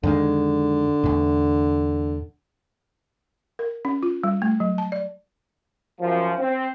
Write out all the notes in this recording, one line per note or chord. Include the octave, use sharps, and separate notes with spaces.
F2 D3 D#3 G#3
E2 A2
A#4
C#4
F4
G3
A3
F#3
A5
D5
F#2 F3
C4